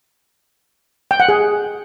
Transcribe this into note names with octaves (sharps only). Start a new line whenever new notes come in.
G5
F#5
G#4